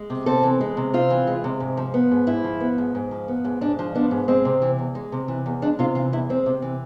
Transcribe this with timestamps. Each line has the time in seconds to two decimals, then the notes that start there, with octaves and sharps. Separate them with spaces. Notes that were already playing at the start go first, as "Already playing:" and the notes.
Already playing: G#3
0.10 C3
0.26 C4 A4
0.43 E3
0.61 G#3
0.77 C3
0.93 C4 F4
1.10 E3
1.27 G#3
1.44 C3
1.60 G#2
1.77 F3
1.94 B3
2.11 G#2
2.27 G#2 E4
2.44 F3
2.60 B3
2.78 G#2
2.95 G#2
3.11 F3
3.28 B3
3.45 G#2
3.61 G#2 D4
3.79 F3
3.95 B3 D4
4.11 G#2
4.28 G#3 C4
4.45 C3
4.62 E3
4.79 E2
4.95 G#3
5.12 C3
5.28 E3
5.46 E2
5.62 G#3 D4
5.79 C3 F4
5.95 E3 F4
6.12 E2 E4
6.29 G#3 C4
6.46 C3
6.62 E3